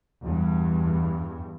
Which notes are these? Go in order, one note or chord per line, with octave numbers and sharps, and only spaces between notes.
E2 G2